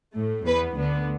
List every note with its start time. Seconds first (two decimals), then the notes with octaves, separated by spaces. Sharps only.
0.14 A2 A3
0.45 E2 E3 B3 B4
0.77 D2 D3 B3